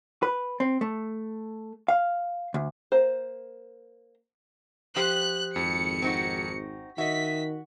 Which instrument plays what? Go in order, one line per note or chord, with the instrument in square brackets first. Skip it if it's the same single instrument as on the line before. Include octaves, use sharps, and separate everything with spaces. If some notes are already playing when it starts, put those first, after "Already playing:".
[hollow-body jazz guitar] B4
C4
A3
F5
D2
[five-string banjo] A#3 C5
[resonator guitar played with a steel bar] F3 G4 C5 [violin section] F#6
[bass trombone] G#1 [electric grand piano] F2 [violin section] C#7
[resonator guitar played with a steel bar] C4 D#4 F#4
[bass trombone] D#3 [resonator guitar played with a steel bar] F#4 [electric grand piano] D#5 E5 [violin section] B6